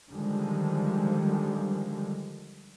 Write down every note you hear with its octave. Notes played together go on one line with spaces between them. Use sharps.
D3 D#3 F3 G3 G#3